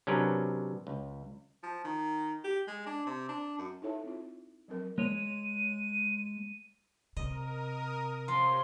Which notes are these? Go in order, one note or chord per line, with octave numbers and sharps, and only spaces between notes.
C3 F#3 C#4 D4 A#4 B4
C#2
F3
D#3
G4
G#3
D4
C3
D4
F#2
D#4 E4 A4 C#5 E5 A5
C4 F4
F3 F#3 C4 A#4
G#3 C#5 D#7
C3 A#4 D#5 D#6
F3 G4 C#5 C6